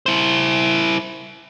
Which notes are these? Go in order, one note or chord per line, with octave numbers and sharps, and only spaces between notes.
E4 C5